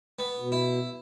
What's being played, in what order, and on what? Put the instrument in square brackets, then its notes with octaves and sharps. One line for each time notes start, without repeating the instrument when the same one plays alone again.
[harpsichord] B3
[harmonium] B2
[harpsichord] E4